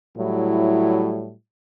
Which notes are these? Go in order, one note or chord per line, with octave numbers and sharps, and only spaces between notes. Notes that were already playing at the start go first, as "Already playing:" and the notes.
A2 F#3 G3 E4